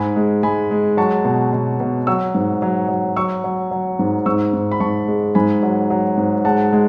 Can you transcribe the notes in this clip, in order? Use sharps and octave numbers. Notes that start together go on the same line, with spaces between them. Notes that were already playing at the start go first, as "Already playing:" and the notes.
Already playing: G#2 G#5 B5
G#3
G#3 G#5 B5
G#3
F#3 A5 C#6
B2
B2
B2
F#3 C#6 E6
G#2
F#3
F#3
F#3 C#6 E6
F#3
F#3
G#2
G#2 C#6 E6
G#2
B5
G#2 A5 C#6
G#3
G#2 G#5 B5
F#3
F#3
G#2
G#3 F#5 A5
G#3